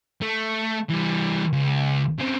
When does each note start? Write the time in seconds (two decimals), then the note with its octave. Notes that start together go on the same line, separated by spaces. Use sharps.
0.22 A3
0.90 E3 G3
1.53 C#2
2.19 C#3 C4